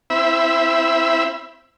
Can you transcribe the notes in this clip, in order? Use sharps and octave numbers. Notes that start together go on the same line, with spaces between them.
C4 E4 E5 B5